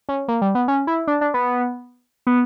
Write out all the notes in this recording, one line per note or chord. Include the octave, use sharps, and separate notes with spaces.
C#4
A#3
G3
B3
C#4
E4
D4
D4
B3
B3